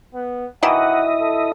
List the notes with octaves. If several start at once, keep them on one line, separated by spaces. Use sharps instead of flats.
B3
B2 D#3 E3 E4 D#5 F#5
A4